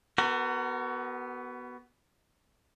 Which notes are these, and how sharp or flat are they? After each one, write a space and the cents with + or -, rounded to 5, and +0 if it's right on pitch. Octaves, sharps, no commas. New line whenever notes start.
B3 +0 F#4 +30 A#4 -30